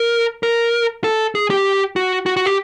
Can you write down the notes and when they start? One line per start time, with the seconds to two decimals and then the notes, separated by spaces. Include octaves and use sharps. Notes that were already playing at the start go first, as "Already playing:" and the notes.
Already playing: A#4
0.43 A#4
1.04 A4
1.35 G#4
1.50 G4
1.96 F#4
2.26 F#4
2.37 F#4
2.46 G4